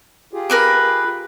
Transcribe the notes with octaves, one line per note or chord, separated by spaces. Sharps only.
F4 G4 G#4
A#4 B4 D6